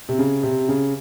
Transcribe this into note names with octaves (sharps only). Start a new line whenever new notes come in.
C3
C#3
C3
C#3